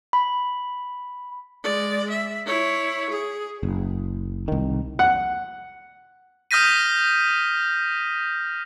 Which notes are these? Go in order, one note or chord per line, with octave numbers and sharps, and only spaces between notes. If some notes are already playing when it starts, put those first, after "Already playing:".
B5
G#3 D5
E5
E4 C#5
G#4
F#1
C2 D#3
F#5
D#6 F6 G6 A#6 B6 D#7